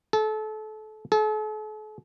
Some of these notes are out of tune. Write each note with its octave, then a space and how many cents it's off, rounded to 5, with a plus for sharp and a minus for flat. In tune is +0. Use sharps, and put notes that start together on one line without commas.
A4 -30
A4 -45